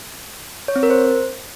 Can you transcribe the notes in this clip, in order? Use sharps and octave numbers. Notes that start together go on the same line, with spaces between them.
C#5
C4
A#4
C5